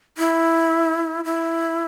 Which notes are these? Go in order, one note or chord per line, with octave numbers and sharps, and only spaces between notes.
E4
E4